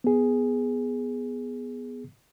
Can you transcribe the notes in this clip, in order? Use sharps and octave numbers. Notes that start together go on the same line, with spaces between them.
B3 G#4